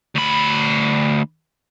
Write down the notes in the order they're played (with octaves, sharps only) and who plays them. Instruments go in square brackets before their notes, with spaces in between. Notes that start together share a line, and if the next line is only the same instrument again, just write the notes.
[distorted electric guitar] D2 B5